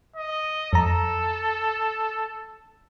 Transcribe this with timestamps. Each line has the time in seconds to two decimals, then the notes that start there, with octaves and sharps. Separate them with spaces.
0.16 D#5
0.73 F2 A4 A#5